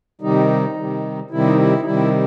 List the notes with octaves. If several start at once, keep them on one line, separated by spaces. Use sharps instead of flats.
C3 D#3 G3 D#4
C3 D#3 G3
C3 D#3 G3 E4
D#4
E4
D#4
C3 D#3 G3 E4